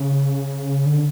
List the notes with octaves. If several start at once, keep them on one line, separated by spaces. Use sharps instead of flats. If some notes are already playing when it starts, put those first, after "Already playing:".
Already playing: C#3
D3